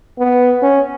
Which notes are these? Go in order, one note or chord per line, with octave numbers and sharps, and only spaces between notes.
B3
C#4